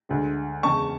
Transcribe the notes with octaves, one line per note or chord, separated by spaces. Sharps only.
D2 D3 G#3
E2 C#3 G#3 A5 C#6